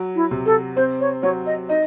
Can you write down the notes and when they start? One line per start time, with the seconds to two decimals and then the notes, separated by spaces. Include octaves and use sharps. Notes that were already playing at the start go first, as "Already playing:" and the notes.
Already playing: F#3
0.15 E4
0.31 C3
0.46 A4
0.76 C4 C5
1.00 C#5
1.23 F#3 C#5
1.46 D#5
1.69 D#4 D#5